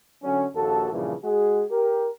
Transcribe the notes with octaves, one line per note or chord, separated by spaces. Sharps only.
D3 F#3 C#4
A#1 D#2 F#4 A4
G2 A#2 C#3 E3 F3
G#3 F#4 G#4
G4 A#4